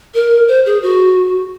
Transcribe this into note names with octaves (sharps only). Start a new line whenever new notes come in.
A#4
C5
G#4
F#4